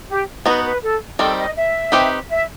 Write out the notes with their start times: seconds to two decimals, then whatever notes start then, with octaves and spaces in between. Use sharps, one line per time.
0.09 G4
0.46 B3 D#4 F#4 B4
0.64 B4
0.82 A4
1.19 D#3 G3 C4 A4
1.37 D#5
1.56 E5
1.92 C4 D#4 G4 B4
2.30 E5